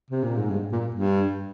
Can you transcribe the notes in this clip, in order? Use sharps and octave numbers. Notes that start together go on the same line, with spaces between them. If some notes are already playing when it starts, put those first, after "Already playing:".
C3
A#2
G#2
G2
A#2
G2